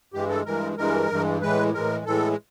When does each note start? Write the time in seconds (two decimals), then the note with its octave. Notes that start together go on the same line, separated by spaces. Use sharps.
0.13 G2 E3 G#3 G4
0.30 A4
0.46 G2 E3 G#3 A#4
0.78 G2 E3 G#3 A#4
1.10 G2 E3 G#3
1.42 A2 E3 G#3 B4
1.74 A2 E3 G#3 A#4
2.06 A2 E3 G#3 A4